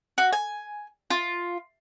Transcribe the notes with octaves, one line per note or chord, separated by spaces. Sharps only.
F#4
G#5
F4